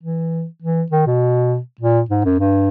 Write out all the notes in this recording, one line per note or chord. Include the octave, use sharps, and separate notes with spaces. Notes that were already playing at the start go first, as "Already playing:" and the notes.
E3
E3
D#3
B2
A#2
G#2
F#2
G2